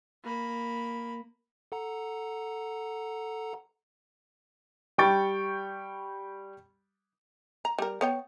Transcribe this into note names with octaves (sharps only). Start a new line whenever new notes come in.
A#3 B5
A4 F#5 A#5
G3 G5 C#6 A6
A#5
G3 A#4
B3 C#5 G5